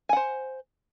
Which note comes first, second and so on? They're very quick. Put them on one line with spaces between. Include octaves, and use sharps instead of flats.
G#5 F#5 C5